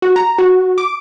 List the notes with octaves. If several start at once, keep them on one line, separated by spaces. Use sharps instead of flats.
F#4
A#5
F#4
D6